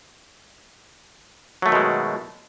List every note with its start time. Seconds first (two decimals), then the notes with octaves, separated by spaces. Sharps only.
1.62 F#3
1.66 A3
1.69 D#3
1.72 B2
1.75 G#3